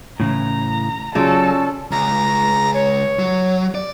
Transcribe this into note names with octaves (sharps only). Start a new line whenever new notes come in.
A2 C#3 E3 A#5
C#3 F#3 C#4 F4 A4 D5
C#2 A#5
C#5
F#3
D5